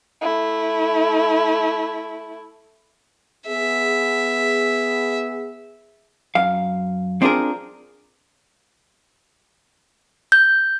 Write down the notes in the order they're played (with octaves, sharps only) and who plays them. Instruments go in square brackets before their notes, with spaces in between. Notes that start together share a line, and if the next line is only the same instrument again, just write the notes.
[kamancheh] A3 E4
[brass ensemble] B3 G#4 [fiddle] E5
[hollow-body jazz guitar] F#2 F5
C4 D4 F4 G#4 A#4
[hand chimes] G6